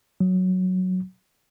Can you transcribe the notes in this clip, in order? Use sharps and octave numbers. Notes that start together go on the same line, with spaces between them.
F#3